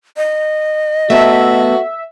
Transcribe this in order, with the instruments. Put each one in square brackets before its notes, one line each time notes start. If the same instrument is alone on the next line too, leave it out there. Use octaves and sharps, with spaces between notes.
[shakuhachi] D#5
[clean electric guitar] A3 B3 A4 [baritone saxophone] F#4 [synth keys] E5